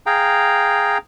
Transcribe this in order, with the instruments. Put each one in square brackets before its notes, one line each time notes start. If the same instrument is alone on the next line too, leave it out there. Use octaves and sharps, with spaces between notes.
[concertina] G#4 F5 G5 A#5